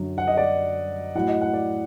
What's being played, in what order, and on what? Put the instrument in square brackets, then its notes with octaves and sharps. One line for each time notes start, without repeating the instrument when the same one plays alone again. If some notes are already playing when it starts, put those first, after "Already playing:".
Already playing: [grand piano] F#2 D3 F#3
F#5
D#5
D5
A2 F#3 F#5
D#5
F#5
D5